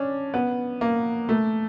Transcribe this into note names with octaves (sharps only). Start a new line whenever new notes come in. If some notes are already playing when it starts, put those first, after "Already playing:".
Already playing: C#4 D4
B3
A#3
A3